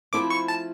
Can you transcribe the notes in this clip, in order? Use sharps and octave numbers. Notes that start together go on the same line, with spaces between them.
F3 A3 C4 E4 D6
C#6
A5